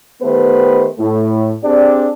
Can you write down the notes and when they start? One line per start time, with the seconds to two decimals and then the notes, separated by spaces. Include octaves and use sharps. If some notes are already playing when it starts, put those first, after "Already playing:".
0.22 D#3 A3 B3 G4 B4 C5
0.99 A2
1.64 C4 D4 G4 G#4 D5